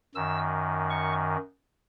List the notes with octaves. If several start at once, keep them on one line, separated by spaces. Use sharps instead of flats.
F#2 D#3 E6
C#6